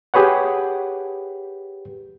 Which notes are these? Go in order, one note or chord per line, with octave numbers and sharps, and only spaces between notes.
G4 G#4 B4 C#5 F#5